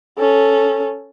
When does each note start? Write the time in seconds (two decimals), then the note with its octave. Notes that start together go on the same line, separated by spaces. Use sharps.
0.18 C#4 A4